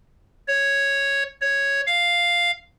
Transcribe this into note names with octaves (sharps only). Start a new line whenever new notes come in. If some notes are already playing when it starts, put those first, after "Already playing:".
C#5
C#5
F5